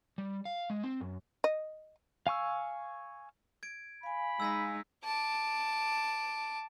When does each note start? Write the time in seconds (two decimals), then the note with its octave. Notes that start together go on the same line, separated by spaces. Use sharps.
0.18 G3
0.45 F5
0.70 G#3
0.83 C4
1.00 F#2
1.44 D#5
2.27 F5 G#5 C#6 E6
3.63 G#6 D7
4.03 F5 G#5 B5
4.40 G#3 D#4 E6 G#6 B6
5.04 A5 D6